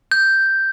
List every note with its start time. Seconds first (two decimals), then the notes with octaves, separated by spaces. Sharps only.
0.12 G6